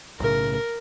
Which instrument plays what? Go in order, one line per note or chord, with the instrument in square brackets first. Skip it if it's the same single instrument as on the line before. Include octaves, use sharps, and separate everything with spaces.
[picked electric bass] B1 A2 C#3 [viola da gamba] A#4